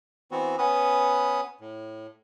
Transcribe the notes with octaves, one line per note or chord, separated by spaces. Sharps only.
E3 B3 C4 F#4
B3 C#4 B4 D#6
A2